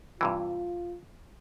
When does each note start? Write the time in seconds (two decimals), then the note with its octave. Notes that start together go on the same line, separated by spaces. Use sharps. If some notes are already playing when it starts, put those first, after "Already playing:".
0.21 G2 C3 E3 F4